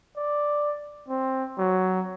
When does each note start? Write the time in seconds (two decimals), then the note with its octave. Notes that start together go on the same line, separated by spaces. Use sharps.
0.17 D5
1.08 C4
1.58 F#3